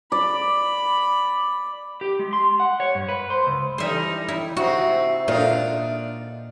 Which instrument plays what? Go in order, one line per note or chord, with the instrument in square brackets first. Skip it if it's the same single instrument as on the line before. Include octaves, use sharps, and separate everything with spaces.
[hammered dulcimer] D5 [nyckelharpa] B5
[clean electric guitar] G4
G#3
C6
F#5
C#5
G2
B4
C5
C#2
[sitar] E3 G3 D#4 [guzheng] C5 E5
[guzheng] E4
[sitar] C3 C4 D#4 [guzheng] F#4 [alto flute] E5
[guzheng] A#2 [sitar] D4 D#4 F4